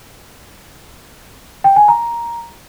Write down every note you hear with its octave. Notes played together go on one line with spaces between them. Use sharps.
G5
G#5
A#5